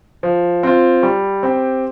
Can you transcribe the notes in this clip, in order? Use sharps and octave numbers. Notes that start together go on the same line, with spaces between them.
F3
C4 F4
G3
C4 G4